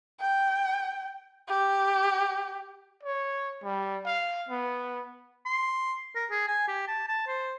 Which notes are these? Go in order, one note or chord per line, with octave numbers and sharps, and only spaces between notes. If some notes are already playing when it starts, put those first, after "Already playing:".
G5
G4
C#5
G3
F5
B3
C6
A#4
G#4
G#5
G4
A5
A5
C5